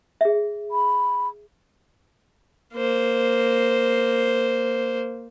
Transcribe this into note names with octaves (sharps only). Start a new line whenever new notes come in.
G#4 E5
B5
A#3 C5